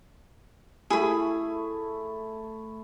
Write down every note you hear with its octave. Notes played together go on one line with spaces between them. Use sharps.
A3 E4 G#4 B5